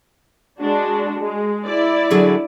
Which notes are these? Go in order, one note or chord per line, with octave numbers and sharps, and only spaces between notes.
G#3 D4 F#4
G#3
E4 D5
D3 F#3 G#4